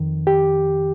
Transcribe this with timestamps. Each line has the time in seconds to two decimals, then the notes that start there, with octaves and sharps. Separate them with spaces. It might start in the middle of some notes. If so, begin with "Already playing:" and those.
Already playing: F2 D#3
0.27 G4